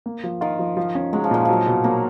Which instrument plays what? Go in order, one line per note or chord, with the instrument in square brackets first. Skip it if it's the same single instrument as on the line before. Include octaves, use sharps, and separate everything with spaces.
[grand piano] A#3
F3
[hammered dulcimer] D#3 [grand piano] F4
[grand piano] F3
F3
C#4
[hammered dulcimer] F#3 [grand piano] G#3
[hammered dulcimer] F3
[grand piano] A#2 [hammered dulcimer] D#3
[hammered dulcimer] F3 [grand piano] F#3
[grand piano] B2
[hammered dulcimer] F#3 [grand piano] A#3